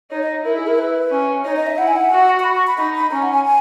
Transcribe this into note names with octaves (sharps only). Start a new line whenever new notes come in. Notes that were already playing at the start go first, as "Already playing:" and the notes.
D#4 C#5
D#5
E4 A#4
G#4
A#4
B4
C#4
D#4 C#5
D#5
E5
E4 F#5
G#5
F#5
F#4
C#6
B5
C#6
B5
D#4 B5
B5
C#4 A#5
F#5
G#5
G#5